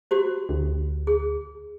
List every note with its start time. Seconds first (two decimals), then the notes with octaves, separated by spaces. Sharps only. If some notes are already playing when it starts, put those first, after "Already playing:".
0.11 F#4 G4 C5
0.49 D2
1.07 G#4